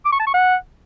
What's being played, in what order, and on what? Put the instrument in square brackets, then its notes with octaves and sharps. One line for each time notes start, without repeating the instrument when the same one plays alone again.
[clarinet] D6
C#6
A5
C#6
F#5